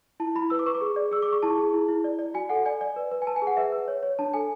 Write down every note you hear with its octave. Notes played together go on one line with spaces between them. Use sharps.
E4 A5
E4 B5
B4 E6
D6
B4 C#6
D6
G#4
D5
G#4 E6
D6
G#4 C#6
E4 A5
G#4
E4
E4
D5
D5
F#4 G#5
A4 F#5
D5 G#5
D5
B4
B4
G#5
B4 A5
G#5
G#4
F#5
B4 E5
B4
C#5
C#5
D4 A5
A4 G#5